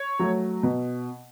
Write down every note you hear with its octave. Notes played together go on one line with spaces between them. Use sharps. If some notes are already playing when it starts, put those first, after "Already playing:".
Already playing: C#5
F#3 A3
B2